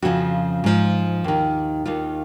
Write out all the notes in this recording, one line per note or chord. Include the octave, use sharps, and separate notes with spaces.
F2 C#3 F3 F#4
G#2 F3
D#2 D#3
D#2 D#3 F4